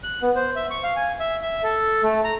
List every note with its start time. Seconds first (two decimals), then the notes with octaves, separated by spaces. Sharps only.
0.03 F#6
0.22 B3
0.36 C5
0.56 E5
0.71 C#6
0.83 F5
0.96 G#5
1.20 E5
1.42 E5
1.63 A4
2.03 A3
2.24 A#5